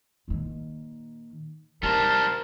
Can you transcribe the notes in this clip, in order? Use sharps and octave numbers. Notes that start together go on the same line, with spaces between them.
A#2 D#3
G3 D#4 A#4 C5 A5